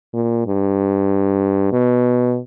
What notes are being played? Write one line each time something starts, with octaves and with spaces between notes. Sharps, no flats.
A#2
G2
B2